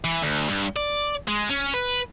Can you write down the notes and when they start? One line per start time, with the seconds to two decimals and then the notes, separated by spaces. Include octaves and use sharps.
0.04 E3
0.22 D2
0.49 G2
0.76 D5
1.28 G#3
1.50 C#4
1.74 B4